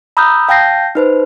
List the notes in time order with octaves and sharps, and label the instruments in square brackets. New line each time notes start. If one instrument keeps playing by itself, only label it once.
[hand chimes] A#5 B5 D#6 E6 F#6 G6
F5 G5 A5 G6 A#6 C7
D#4 B4 C5